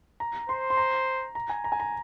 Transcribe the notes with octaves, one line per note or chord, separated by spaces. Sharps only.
A#5
C5 C6
C6
A#5
A#5
G#5
A#5
G#5
A#5